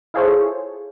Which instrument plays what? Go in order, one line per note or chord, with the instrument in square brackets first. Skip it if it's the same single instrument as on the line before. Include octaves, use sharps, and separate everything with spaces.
[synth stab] E4 F4 G#4 A4 C5 C#5